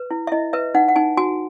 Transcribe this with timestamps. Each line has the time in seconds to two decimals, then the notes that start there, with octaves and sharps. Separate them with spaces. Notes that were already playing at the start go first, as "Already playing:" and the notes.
Already playing: B4
0.11 E4
0.27 E5
0.32 E4 D#5
0.53 B4 E5
0.75 D#4 F#5
0.88 F#5
0.96 D#4 G#5
1.17 F#4 G#5